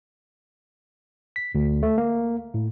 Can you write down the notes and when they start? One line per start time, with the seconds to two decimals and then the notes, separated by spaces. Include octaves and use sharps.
1.36 B6
1.55 D2
1.83 A3
1.98 A#3
2.54 A2